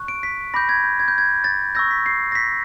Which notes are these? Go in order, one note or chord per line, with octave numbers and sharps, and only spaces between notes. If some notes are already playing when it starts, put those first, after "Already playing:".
Already playing: C#6 F#6
D7
B6
B5 D6 G6 A#6
G#6
G6
G#6
G6
G#6
A6
C#6 E6 G6 A#6
B6
C7
A#6
B6